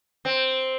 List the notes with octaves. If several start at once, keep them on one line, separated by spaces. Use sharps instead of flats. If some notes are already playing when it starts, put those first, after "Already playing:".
C4